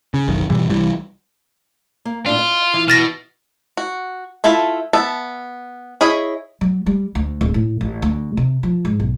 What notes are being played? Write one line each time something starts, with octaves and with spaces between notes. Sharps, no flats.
C#3
F#1 B1 F#2 D#3
G2 B2 E3 G3
C2 E3 G3
A#3
A2 D4 F4
D#5
E3
B2 F6 A6 A#6
F#4
A3 E4 F4 A4 E5
B3 E5 A5
E4 G#4 C#5 D#5 B5
F#3
G3
D2
D1
A2
A1
D2
C3
F3
G#2
B1